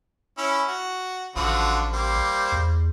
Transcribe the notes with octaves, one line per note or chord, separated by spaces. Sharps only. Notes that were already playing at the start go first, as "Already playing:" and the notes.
C#4 E4
F#4
A1 D3 F3 F#4
G3 A#3 C5
E2